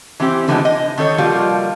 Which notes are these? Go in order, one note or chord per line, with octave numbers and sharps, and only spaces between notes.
E3 C4 G4 C5
D3 E3 F3 G#3 B3 D#4
D#5
D#3 D#4 A4 C#5
F3 G3 A#3 F4 F#4